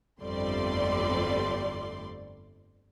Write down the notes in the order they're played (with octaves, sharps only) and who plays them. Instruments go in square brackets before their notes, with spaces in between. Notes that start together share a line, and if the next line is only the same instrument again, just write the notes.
[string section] G1 F2 G3 A3 D5 C6